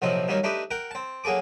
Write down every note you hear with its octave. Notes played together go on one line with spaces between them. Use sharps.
A#1 C3 F3 F#3 C4 D#4
D#3 F#3 G3 A#3 C#4 D#4
A3 D4 D#4 G4 B4
A#4 F#5 G5
C4 A5
F#3 A#3 G#4 A4 D6